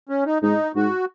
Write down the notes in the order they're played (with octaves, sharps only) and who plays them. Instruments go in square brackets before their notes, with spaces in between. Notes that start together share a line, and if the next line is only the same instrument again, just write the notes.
[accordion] C#4
D#4
[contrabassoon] G#2 [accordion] D#4
[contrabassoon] G#2 [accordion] F#4